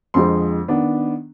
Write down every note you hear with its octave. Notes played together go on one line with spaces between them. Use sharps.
F2 D3 F3 G#3 C4 C6
D#3 B3 D4